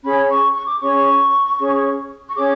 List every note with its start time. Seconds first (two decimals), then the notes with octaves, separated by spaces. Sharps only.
0.03 C#4 G#4 C#5 B5
0.30 C#6
0.55 C#6
0.67 D6
0.79 C#4 G#4 C#5 C#6
1.59 C#4 G#4 C#5
2.29 C#6
2.36 C#4 G#4 C#5 D6